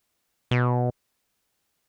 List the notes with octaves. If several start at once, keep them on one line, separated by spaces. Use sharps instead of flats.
B2